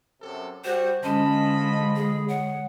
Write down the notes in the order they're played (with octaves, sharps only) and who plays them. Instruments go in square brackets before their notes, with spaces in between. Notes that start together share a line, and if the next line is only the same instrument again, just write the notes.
[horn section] F#2 C3 A4
[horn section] G3 F#4 [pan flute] C5
[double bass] D3 G#3 [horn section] F3 D#5 B5 [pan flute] C#4 [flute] A5
[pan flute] G#4
[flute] C#5 [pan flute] F#5